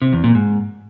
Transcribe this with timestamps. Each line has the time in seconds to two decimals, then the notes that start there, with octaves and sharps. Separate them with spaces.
0.02 C3
0.13 E2
0.24 A#2
0.35 G#2